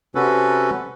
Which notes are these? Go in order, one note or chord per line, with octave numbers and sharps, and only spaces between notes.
C3 C#4 F#4 A4 B4